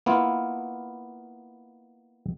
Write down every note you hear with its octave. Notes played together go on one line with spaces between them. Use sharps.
A#3 B3 E4 F4